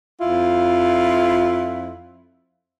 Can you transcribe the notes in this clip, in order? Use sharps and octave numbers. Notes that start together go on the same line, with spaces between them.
F2 E4 F4